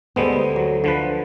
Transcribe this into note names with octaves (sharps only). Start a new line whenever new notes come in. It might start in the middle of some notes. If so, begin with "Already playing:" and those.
D2 G3 G#3 B3 A4 C5
F#3
D3 F3 B4